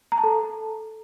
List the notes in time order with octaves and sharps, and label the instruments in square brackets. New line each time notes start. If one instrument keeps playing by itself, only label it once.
[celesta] A#5
A5
A4